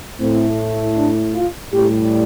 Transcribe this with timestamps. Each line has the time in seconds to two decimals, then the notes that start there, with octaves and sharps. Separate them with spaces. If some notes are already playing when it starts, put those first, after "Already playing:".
0.20 A2 A3 C4
0.96 D4
1.34 F4
1.73 A2 G3 G4